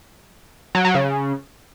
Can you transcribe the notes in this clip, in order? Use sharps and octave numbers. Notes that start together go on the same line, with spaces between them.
F#3
F#3
C#3